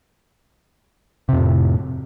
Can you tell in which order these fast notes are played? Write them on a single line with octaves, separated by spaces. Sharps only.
C3 F2 A2